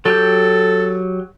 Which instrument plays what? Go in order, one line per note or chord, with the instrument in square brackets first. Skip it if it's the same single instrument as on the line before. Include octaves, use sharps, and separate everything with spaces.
[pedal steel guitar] F#3 G4 G6 [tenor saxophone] A4